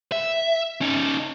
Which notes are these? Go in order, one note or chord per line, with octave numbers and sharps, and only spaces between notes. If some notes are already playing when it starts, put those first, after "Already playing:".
E5
C#4 D#4